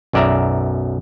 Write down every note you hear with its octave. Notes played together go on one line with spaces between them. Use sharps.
B1 F#2 D5 E5 A#5